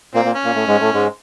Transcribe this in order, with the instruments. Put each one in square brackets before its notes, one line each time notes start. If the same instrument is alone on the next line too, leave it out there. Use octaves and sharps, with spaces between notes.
[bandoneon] A#2 A#3 [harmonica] C4
[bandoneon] A#2 A#3
[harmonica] C#4
[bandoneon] A#2 A#3
A2 A3
G#2 G#3
A2 A3
G#2 G#3